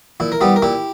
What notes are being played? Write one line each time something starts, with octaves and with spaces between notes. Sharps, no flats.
A#2 E4
A#4
G3 B3 E4 G4
A#4
A#2 E4 G4